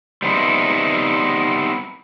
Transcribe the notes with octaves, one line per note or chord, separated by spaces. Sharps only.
G3 B3 C4 D#4 E4